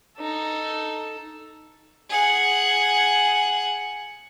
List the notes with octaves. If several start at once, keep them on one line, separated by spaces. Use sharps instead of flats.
D#4 A4
G#4 F#5